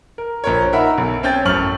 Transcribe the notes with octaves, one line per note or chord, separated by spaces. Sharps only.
A#4
A#1 A#4 C#5
D#4 A#4 E5 F#5 B5
B1
C4 C#4 G5 G6 A6
A1 F#2 C#6 F6 F#7